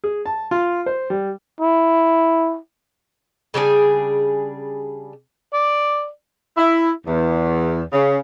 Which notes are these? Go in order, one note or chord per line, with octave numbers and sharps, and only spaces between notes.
G#4
A5
F4
C5
G3
E4
C#3 G3 D4 G#4
D5
E4
E2
C#3